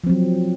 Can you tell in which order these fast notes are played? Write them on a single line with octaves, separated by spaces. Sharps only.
F3 C4 F#3